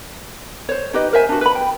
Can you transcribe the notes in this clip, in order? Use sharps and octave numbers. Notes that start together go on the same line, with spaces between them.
C5 C#5
D#4 G4 B4 D#5
A#4 C5 E5 G#5
D4 F#4
B4 B5
G5